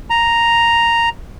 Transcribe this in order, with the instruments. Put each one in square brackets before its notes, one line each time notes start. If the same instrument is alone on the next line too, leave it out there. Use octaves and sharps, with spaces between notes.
[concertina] A#5